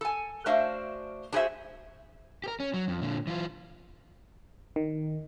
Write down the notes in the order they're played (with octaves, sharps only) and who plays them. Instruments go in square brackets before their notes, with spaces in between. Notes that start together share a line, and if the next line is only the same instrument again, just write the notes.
[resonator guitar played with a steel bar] A4 G#5
A3 D4 F#4 C5 E5 F5
D4 F#4 G#4 A#4 C5 E5
[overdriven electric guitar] G4 A#4
C#4
F#3
F2
A#2 D3
E3 F4
[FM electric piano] D#3